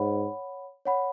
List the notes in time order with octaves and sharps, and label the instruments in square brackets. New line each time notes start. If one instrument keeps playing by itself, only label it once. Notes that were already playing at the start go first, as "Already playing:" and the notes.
Already playing: [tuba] G#2 [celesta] C#5 F#5 B5
[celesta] C#5 F#5 B5